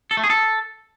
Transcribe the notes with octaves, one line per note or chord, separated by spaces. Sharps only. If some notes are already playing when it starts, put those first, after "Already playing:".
A4
A3
G#4
A4